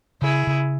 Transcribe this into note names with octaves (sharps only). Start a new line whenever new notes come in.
C#3 E4 G#4
C#3